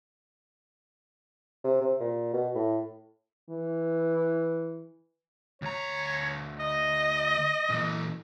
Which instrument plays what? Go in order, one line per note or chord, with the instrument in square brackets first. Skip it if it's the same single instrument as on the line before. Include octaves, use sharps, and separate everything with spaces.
[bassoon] C3
C3
A#2
B2
A2
[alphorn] E3
[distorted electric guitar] D2 A#5 [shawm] C#5
[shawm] D#5
[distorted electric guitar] A#2 E3